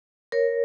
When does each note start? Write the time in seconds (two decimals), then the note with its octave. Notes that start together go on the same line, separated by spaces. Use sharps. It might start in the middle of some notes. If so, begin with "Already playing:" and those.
0.32 A#4 C#5